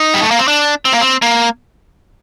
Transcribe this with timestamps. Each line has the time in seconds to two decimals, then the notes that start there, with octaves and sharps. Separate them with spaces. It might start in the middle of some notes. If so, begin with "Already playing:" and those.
Already playing: D#4
0.14 G3
0.22 A3
0.31 A#3
0.39 C4
0.48 D4
0.85 C4
0.93 A#3
1.01 C4
1.22 A#3